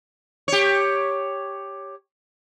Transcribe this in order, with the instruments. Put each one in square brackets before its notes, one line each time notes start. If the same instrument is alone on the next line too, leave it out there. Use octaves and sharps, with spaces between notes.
[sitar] G4 C#5